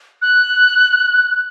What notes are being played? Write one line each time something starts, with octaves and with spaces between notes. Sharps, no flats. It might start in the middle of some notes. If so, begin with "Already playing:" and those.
F#6